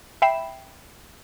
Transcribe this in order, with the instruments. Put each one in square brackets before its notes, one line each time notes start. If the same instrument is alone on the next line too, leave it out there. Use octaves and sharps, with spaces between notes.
[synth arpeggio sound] E5 G5 B5 C7 E7